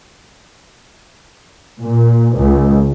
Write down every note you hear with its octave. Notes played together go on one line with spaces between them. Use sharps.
A#2
C#2